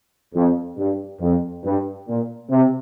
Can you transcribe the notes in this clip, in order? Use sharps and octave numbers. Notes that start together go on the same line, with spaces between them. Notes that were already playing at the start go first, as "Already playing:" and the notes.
F2
G2
F2
G2
A#2
C3